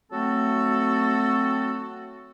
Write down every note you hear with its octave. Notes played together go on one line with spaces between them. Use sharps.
F#3 A3 C4 F#4 A4